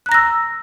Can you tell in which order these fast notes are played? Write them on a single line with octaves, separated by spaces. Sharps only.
F#6 A#5 A#6 E6